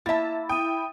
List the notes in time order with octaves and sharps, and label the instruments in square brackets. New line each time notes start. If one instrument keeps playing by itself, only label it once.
[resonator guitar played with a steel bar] A#3 E5 [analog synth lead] E4 [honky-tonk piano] A5 A6
[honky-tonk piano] G5 [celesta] D#6 D#7